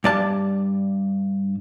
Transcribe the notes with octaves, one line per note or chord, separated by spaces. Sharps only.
G2 D5 A5